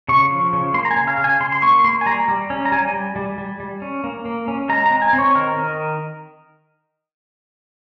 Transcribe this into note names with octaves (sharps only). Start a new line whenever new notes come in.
C#3 C#6
F3
C#3
A#3 C6
A#5
G#5
C#3
F5
C#3
G#5
C#3 C6
C6
A#3 C#6
A#3 C6
G#5
G3 A#5
G3
C#4
A#5
G3 G#5
G3
G3
G3
G3
C#4
A#3
A#3
C#4
G#3 A#5
C4 A#5
G#5
C4
C#5
D#3 A#4
D#3